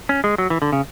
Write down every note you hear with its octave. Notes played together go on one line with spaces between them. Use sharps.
C#4
G#3
F#3
E3
D3
C#3